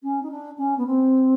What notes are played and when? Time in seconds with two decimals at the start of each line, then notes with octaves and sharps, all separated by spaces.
0.03 C#4
0.23 D#4
0.31 D4
0.58 C#4
0.78 B3
0.87 C4